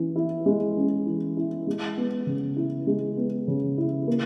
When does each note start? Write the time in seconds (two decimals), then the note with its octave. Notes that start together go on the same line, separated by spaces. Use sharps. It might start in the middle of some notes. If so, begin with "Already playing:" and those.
Already playing: E3 C#4
0.16 E4
0.46 G#3
0.77 C#4
1.06 E3
1.37 E4
1.67 G#3
1.97 B3
2.26 C#3
2.56 E4
2.87 G#3
3.17 B3
3.47 C#3
3.78 E4
4.08 A#3